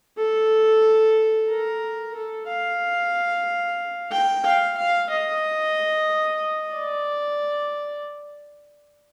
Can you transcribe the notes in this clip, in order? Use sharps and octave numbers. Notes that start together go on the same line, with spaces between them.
A4
A#4
A4
F5
G5
F5
F5
D#5
D5